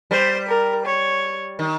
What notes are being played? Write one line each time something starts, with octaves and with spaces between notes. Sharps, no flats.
G3 C5
A#4
C#5
D#3